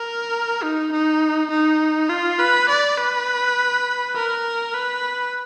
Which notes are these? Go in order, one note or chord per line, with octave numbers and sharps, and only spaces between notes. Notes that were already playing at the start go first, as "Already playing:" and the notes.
Already playing: A#4
D#4
D#4
D#4
F4
B4
D5
B4
A#4
B4